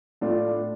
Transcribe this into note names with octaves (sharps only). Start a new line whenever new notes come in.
A2 A3 D4 F4